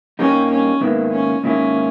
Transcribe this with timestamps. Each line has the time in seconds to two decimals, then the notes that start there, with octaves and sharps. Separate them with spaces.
0.19 G2 G3 A#3 C#4 D#4 G4
0.51 C#4
0.81 G#2 D#3 A#3 B3 E4
1.12 C#4
1.44 G#2 D#3 A#3 C#4 E4